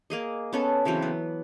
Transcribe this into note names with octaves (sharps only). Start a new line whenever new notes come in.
A#3 G#4 D#5
B3 C#4 A4
C#3 E3 F#3 C4
B3